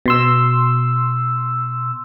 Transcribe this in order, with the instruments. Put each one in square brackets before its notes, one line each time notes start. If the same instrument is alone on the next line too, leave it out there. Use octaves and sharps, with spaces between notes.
[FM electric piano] B2 C6 E6